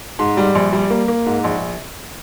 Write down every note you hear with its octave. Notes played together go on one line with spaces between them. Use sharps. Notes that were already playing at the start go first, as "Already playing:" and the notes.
G#2 C6
G3
A#1
G3
A#3
A#3
G#2
A#1